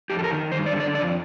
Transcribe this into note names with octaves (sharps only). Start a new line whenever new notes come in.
F2 G4
A4
A#4
D#3
G2 C5
D5
D3
D5
F2 D5